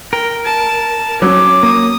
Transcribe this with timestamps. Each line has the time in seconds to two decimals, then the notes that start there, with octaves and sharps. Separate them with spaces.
0.13 A#4 G5
0.46 A5
1.22 F#3 C#4 D6
1.63 A#3 D#6